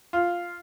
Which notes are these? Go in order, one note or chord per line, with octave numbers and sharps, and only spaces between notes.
F4